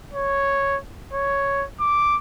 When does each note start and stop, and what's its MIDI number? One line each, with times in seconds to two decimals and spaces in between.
0.13 0.78 73
1.13 1.66 73
1.80 2.17 86